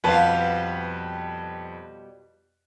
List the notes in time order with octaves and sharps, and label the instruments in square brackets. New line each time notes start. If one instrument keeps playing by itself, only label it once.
[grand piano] F2 B4 A5 [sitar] B2 G3 F4